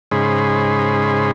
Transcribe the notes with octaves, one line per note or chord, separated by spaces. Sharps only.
G#2 C#3 D#4 G#4 C5 B5